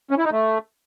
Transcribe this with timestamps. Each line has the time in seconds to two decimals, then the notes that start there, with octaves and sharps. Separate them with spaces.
0.11 C#4
0.18 E4
0.25 D#4
0.32 A3